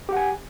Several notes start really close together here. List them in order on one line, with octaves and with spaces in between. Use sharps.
G4 F#5 G#5